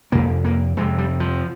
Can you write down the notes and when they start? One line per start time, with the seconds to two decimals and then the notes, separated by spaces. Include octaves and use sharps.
0.12 F2 C3 A#3
0.45 A#3
0.77 F2 C3 G#3
0.98 G3
1.20 F3